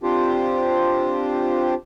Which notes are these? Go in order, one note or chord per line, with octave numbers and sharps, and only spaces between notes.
C4 D4 F4 G4 C5